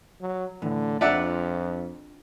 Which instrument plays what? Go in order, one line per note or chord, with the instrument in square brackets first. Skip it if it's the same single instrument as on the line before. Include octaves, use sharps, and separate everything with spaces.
[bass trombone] F#3
[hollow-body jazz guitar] A2 E3 [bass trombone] D3
[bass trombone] F2 [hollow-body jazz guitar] D4 F4 [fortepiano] D5 E5 F#5